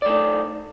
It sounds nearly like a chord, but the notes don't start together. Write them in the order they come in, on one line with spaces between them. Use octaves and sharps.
D5 A3 D#4